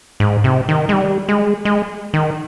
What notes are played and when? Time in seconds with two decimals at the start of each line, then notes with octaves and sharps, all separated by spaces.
0.20 G#2
0.44 C3
0.69 D#3
0.89 G#3
0.93 G3
1.29 G#3
1.65 G#3
2.14 D#3